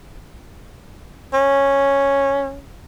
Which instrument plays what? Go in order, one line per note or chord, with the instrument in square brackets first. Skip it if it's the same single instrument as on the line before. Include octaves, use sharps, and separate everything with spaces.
[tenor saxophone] C#4